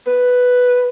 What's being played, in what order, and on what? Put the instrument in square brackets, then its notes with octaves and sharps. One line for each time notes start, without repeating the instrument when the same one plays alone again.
[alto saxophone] B4